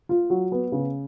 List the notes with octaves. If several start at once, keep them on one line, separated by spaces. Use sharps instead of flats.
F4
F#3
B3
C#3